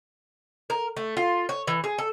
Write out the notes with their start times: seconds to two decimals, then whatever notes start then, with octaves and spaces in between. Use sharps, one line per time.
0.70 A#4
0.97 A3
1.17 F4
1.49 C#5
1.67 E3
1.84 G#4
1.98 A4